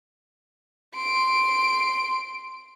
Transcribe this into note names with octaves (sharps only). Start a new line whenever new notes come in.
C6 D7